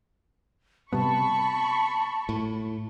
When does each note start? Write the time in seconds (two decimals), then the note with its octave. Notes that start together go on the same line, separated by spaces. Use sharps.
0.93 C3 G3 B3 A5 B5 C#6
2.29 A2